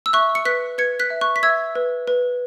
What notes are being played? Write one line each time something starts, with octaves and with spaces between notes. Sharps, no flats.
E6
E5 C#6 F#6
C#7
B4 F#6 B6
B4 G#6 C#7
F#6 B6
E5
C#6 F#6
B6
E5 E6 G#6
B4
B4